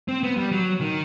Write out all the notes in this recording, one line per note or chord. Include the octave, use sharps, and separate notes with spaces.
C4
B3
G3
F#3
D#3